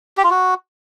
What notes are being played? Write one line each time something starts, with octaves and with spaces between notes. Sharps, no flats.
G4
F4
F#4